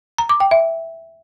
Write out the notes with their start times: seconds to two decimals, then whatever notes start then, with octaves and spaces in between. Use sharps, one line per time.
0.18 A#5
0.29 D6
0.40 G5
0.51 E5